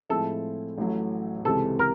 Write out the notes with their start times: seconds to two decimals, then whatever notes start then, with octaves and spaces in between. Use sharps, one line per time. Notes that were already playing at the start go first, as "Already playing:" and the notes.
0.09 A2 F3 G#3 C4 E4 A4
0.78 A1 A2 F#3 A3
1.45 C#2 C3 E3 G#3 C4 A4
1.79 A#4